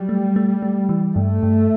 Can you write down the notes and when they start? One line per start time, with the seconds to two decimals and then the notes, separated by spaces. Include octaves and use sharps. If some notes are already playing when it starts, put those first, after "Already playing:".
Already playing: F#3 G3
0.09 A3
0.36 A3
0.62 A3
0.89 E3
1.16 G2 A3
1.43 G2